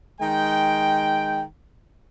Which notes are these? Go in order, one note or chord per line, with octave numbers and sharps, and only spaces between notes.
D#3 G#3 G5